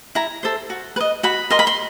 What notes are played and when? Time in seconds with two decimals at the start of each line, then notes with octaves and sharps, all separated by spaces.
0.15 E4 A#5
0.43 A4 C5
0.70 F#4
0.96 B4
1.00 D#5
1.23 F#4 B5
1.51 A#4 D#5 C6
1.59 B5
1.67 C6